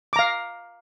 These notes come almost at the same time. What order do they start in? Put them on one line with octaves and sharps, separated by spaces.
D6 A#5 F5